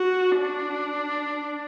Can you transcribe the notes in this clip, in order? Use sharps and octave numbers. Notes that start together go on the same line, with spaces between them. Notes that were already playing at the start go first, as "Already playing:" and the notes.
Already playing: F#4
D4